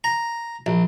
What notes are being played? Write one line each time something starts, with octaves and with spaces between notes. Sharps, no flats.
A#5
A#1